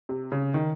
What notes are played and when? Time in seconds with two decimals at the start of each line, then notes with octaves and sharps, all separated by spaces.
0.09 C3
0.32 C#3
0.54 D#3